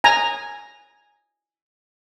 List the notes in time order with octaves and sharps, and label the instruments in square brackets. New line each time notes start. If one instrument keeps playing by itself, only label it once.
[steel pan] G#5 A#5